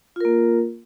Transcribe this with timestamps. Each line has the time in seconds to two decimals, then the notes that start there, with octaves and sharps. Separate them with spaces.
0.16 F4
0.20 A#4
0.25 A#3